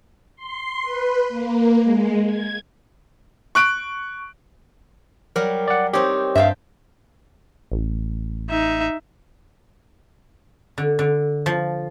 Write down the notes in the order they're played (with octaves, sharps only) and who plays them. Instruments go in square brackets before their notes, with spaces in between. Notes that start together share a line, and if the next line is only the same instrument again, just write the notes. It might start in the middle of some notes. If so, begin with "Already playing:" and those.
[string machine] C6
B4
A#3
G#3
G#6
[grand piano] C#6 F#6 D7
[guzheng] F#3 G3 [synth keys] A#4
[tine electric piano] D5 F#5
[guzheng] C4 D#4 [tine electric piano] G4 C#5
[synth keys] G2 [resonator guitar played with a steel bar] E5 F5 [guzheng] G5 A5
[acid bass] A1
[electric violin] D#4 E5
[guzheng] D3
D3
F3